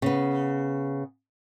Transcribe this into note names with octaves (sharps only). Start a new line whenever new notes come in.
C#3 B3